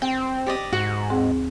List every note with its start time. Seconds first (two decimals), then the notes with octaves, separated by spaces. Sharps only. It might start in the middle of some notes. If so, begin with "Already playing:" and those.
0.02 C4 G5
0.47 G4 D5 D#5
0.73 G#2 F#4
1.10 D#2 C4 G#4